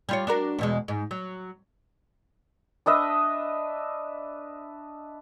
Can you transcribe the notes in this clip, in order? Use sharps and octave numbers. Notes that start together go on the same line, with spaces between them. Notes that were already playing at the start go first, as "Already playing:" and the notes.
G3 F4 C#5
D4 F#4 A#4
E2 B2 G#3
G#2
F#3
D4 B4 D#5 E5